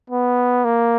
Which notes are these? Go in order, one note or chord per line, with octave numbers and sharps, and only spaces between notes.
B3
A#3